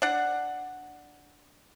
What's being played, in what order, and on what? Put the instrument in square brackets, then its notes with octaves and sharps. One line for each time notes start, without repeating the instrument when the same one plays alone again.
[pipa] D4 F#5